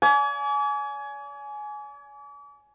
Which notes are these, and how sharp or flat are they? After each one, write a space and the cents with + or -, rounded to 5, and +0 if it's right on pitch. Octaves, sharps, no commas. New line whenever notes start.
D5 -40 G#5 +20